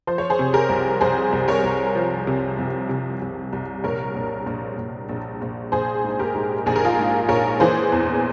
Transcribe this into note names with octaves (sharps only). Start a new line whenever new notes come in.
F3 C5
C#5
G#4 C5
C3
G4 A#4
C2
C2 G#4 C5
C2
A#4 C#5
C2
F3
C3
C2
C3
C2
C2
A#1 A#4 C#5
A#1
A#1
A#1
A#1
A#1
A#1 G#4 C5
G#2
G4 A#4
G#2
A#1 G#4
A#4
F4 G#4
G#2
A#1 A#4 C#5
E3 G#4 C5
E2